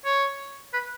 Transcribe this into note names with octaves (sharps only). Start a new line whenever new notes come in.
C#5
B4